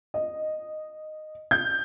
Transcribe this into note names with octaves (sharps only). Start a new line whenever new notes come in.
D#5
G6